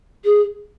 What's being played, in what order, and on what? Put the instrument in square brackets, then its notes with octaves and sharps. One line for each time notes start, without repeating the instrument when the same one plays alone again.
[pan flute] G#4